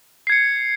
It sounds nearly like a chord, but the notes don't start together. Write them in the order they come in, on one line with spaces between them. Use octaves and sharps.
C7 G#6 C#7